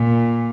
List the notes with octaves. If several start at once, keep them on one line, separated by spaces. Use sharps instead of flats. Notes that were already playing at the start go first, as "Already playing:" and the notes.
Already playing: A#2